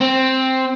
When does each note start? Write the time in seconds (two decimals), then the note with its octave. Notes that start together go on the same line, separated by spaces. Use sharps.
0.01 C4